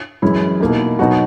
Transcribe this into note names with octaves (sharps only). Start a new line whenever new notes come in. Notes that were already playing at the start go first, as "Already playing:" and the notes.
F#2 E3 G#3 C#4 E4
B2 A#3 D#4
B2 F#3 B3 D#4 F#4